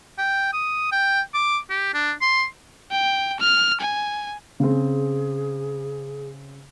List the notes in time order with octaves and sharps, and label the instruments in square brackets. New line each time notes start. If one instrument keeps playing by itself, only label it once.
[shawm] G5
D#6
G5
D6
G4
D4
C6
[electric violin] G5
F6
G#5
[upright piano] C#3 C4 [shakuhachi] G#4